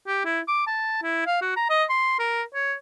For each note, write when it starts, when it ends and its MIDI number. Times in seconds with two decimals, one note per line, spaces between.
0.07 0.25 67
0.25 0.40 64
0.48 0.66 86
0.67 1.01 81
1.03 1.24 64
1.26 1.38 77
1.42 1.54 66
1.56 1.69 82
1.70 1.84 75
1.89 2.17 84
2.19 2.42 70
2.54 2.74 73